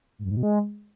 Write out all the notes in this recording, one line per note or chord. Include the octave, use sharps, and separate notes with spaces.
G#2
F#2
G#2
B2
G#3